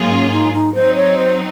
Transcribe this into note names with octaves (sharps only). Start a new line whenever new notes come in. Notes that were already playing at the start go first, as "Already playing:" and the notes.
Already playing: G#2 F#3 A#3 F4 G#4
C#4
D#4
D#4
F#3 C4 D#4 C5
C#5
C5